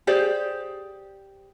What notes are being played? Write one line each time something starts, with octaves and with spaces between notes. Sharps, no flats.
G4 G#4 C5 D5